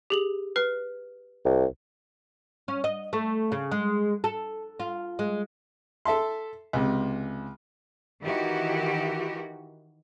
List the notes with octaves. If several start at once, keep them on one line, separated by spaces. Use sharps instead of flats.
G4 G#4 F#7
B4 F6 C7
C2
C#4
D#5
A3
C#3
G#3
A4
F4
G#3
A4 E5 A5 C6
C#2 C3
D#3 E3 E4 F#4 G4